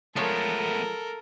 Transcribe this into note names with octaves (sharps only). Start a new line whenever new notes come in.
F3 G#3 A3 B3 A4 A#4 C#5